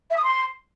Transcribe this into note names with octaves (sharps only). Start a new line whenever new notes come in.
E5
D#6
C6